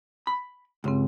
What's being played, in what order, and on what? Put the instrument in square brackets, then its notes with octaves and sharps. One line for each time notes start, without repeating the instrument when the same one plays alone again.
[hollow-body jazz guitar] B5
[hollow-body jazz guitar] C#2 [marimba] G2 C#3 C4